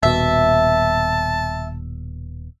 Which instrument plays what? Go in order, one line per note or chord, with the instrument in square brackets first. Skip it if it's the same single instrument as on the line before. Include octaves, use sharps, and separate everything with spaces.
[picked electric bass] D#1 B2 [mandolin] E5 [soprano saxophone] A5